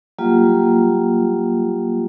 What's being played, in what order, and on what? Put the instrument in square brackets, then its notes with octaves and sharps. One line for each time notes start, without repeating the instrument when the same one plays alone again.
[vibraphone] F#3 G3 A#3 F4 G4